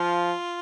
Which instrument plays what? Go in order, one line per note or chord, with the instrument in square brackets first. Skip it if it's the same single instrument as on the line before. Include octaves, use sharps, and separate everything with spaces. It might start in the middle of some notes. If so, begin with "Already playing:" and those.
Already playing: [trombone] F3 [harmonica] F4